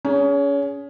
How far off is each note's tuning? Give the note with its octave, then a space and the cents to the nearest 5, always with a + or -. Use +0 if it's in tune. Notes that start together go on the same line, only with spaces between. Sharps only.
C#4 +30 G#4 +0